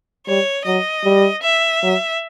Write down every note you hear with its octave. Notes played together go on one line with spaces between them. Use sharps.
G3 C#5
F#3 D#5
G3
E5
F#3